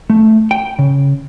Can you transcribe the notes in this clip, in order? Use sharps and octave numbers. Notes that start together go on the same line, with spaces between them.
A3
G5
C#3